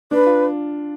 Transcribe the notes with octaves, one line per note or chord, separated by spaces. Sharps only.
D4 B4
F4